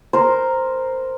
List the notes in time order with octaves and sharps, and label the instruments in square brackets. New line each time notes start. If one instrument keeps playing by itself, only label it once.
[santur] A#4 C5